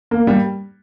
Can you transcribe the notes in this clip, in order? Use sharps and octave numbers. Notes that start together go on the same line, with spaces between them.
A#3
G3